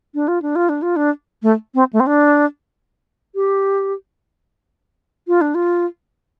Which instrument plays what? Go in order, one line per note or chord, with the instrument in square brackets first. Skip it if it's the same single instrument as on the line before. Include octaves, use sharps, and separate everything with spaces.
[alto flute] D4
F4
D4
F4
D4
F4
D4
A3
C4
A3
C4
D4
G4
F4
D4
F4